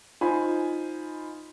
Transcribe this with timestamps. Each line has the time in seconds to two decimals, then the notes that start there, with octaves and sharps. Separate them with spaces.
0.21 D#4 F4 C5 G#5 B5